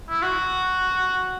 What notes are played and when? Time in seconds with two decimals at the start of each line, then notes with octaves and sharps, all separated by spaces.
0.10 E4
0.23 F#4